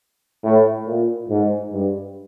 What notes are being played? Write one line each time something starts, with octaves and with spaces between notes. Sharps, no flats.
A2
A#2
G#2
G2